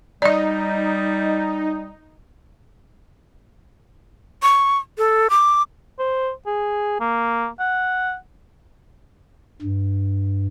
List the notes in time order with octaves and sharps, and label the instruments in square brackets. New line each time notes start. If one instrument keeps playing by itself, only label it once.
[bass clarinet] G3 [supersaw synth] D#4 [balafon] D5 D#5
[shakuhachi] C#6
A4
D6
[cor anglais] C5
G#4
A#3
F#5
[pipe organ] G2